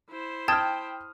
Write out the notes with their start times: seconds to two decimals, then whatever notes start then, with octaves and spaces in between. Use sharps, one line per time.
0.10 E4 C5
0.48 G5 A5 D#6 F6 G#6 A6